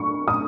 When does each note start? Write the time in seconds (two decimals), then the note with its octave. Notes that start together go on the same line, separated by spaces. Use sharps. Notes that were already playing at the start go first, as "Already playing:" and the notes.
Already playing: C#6
0.28 D#6